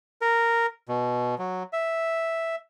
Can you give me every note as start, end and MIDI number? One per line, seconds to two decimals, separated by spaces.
0.21 0.66 70
0.89 1.35 47
1.38 1.63 54
1.73 2.56 76